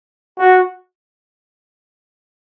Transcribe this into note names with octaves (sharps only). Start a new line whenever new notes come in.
F#4